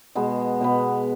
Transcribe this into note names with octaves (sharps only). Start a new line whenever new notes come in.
B2 G#3 B3
B2 G#3 B3